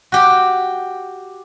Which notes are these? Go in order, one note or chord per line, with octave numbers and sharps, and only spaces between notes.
F#4 G4